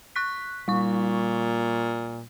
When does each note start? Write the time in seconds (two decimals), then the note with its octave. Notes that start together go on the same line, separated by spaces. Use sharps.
0.16 C#6 F#6 B6
0.68 A#2 G3 C#6